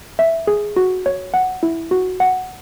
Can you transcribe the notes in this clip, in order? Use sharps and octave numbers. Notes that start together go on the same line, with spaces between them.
E5
G#4
F#4
C#5
F#5
E4
F#4
F#5